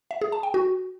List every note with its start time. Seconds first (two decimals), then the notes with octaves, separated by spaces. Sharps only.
0.11 E5
0.21 G#4
0.32 A5
0.43 G5
0.54 F#4